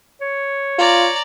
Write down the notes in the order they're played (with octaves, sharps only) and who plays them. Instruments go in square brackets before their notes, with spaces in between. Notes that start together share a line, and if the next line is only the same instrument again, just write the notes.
[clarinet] C#5
[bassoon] F4 [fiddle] D5 A#5